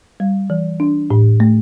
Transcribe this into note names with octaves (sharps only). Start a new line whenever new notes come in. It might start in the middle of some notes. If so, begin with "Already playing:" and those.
G3
E3
D4
A2
A3